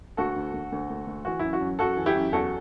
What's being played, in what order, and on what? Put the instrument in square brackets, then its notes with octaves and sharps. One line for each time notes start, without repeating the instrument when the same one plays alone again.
[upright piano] D2 F#4 A4
D2
D2
D2
D2
D2
E3 F#4
F#2 E4
F#4
F#2
F#2 F#4 A4
E3
E4 G4
F#2
E2 F#4 A4